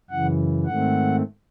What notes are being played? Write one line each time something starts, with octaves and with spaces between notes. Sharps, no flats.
F#2 C#3 E3 F#5
G#2 D#3 A3 C4 F#5